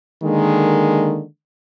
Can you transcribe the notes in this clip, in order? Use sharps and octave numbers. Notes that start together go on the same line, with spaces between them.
D3 D#3 G#3 A#3